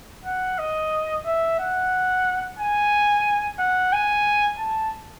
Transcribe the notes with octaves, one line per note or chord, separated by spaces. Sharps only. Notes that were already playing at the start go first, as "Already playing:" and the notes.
F#5
D#5
E5
F#5
G#5
F#5
G#5
A5